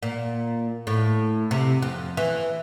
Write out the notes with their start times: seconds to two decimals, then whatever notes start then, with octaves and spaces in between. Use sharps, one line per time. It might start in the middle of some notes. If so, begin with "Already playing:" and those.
0.03 A#2
0.87 A2
1.51 C3
1.82 F2
2.17 E3